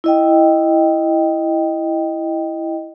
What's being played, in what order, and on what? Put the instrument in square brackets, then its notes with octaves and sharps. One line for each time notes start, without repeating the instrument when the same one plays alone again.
[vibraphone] E4 D#5 G5